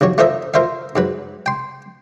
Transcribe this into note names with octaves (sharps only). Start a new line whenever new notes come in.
A#1 D#2 F#3 C#5
A3 F4 A#4 C5 D#5 E5
F4 A#4 C5 E5 F5
G#2 F#3 B4
G5 C6